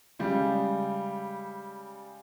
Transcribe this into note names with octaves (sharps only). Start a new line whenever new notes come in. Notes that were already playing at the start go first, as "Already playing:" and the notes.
C#3 G3 G#3